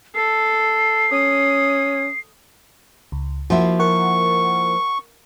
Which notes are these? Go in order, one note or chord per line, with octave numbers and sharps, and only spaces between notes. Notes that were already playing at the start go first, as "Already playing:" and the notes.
A4 C7
C#4 D#6
C#2
F3 A#3 E4 F#4
A#4 F#5 C#6